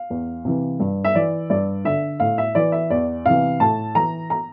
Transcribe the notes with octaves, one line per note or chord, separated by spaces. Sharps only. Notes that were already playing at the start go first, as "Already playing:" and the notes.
Already playing: F5
E2
C3 E3
G2
E5
E3 D5
G2 D5
D3 E5
A2 F5
E5
E3 D5
E5
E2 D5
C3 E3 F5
A2 A5
E3 A#5
A#5